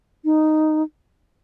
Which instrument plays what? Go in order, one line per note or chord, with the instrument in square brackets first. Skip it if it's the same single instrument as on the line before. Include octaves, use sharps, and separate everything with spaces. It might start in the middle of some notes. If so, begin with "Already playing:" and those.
[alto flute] D#4